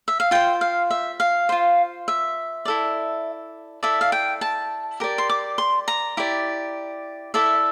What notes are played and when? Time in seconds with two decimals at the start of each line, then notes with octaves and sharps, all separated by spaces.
0.08 E5
0.20 F5
0.31 F4 C5 G5
0.61 F5
0.91 E5
1.20 F5
1.49 F4 C5
2.08 E5
2.65 E4 A4 D5
3.83 E4 A4 D5 E5
4.01 F5
4.12 G5
4.41 A5
5.00 G4 A#4 D5
5.18 C6
5.30 D6
5.58 C6
5.88 A#5
6.17 E4 G4 D5
7.34 E4 A4 D5 E5